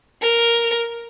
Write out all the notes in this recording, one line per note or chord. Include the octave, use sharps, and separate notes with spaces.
A#4